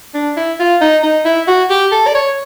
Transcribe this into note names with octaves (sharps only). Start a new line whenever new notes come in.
D4
E4
F4
D#4
D#4
E4
F#4
G4
A4
D5
C#5